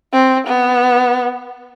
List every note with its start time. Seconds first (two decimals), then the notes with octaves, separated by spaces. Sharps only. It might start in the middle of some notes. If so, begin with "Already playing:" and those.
0.13 C4
0.47 B3